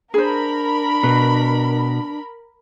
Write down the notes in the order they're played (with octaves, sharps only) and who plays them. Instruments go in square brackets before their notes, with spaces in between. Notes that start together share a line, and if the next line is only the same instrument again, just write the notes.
[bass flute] D4 [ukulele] G#4 C5 [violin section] A#4 B5
[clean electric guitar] B2 [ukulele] B4